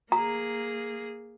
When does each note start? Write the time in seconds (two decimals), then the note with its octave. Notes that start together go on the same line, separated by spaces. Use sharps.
0.12 A#3 G#4 A#5